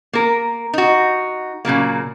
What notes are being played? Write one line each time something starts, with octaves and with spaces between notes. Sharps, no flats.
A#3 A#4
D#4 F#4
A#2 C#3 F#3 A#3